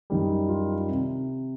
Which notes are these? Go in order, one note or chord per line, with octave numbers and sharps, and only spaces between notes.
F#2 D#3 G3
F4
C3